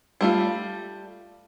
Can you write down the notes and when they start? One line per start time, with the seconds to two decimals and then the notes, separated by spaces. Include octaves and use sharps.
0.21 G3 A3 F4